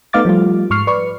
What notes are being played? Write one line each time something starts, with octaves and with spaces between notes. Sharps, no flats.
A3 B3 D#4 F5 D6 A6
F3 G3 A3 F4
G#2 C#6 F6 C7
B4 D5 C#6